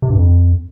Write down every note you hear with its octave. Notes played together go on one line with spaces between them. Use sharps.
C3
G2
F2